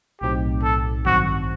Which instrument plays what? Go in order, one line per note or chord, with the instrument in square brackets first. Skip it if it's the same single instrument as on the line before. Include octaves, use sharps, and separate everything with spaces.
[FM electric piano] B1 A2 F#3 C4 D#4 [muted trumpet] G4
[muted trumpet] A4
[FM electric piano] A1 G2 D#3 F#3 C4 [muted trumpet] F#4